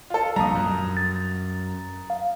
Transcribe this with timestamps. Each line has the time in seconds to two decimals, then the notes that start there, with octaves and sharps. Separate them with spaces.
0.10 F4 A4
0.36 A#1 G3 A#5 D#6
0.55 F#2
0.97 A6
2.10 F5